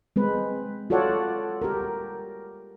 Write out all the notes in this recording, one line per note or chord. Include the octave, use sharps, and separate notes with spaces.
G#3 C4 B4
F4 F#4 A4 C#5 D5 F#5
G4 A#4